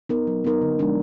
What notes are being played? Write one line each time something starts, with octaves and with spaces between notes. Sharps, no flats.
B3 D#4 A#4
F#3
B3 D#4 A#4
D3
F3 G#3 D4